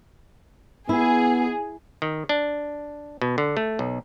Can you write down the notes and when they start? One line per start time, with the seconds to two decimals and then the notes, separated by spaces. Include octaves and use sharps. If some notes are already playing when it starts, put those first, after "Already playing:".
0.89 B3 E4 G#4
2.02 D#3
2.29 D4
3.22 B2
3.38 D3
3.57 A3
3.79 B1